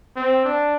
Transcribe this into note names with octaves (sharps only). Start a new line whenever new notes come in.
C4
D4